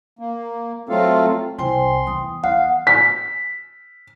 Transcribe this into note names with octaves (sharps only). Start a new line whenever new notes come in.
A#3
F#3 A3 C4 F4 A4 F5
C2 C5 G5 G#5 C6
E2 D#6
E2 F5 F#5
B6